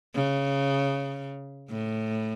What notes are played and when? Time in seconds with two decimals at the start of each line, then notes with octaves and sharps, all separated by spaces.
0.15 C#3
1.70 A2